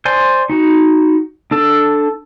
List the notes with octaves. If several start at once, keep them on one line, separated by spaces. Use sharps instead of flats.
C5 D5 G#5 C6
D#4 F#4
D4 A4